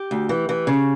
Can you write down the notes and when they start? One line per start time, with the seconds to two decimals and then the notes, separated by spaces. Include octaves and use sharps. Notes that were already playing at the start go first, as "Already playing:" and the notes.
Already playing: G4
0.11 D2
0.29 E3
0.49 E3
0.67 C#3